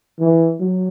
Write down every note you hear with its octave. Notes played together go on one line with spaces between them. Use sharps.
E3
F#3